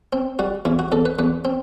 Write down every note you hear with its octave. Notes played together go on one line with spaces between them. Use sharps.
C4
G3 F#4
E2 E4
F#4
E2 A4
B4
E2 B4
C4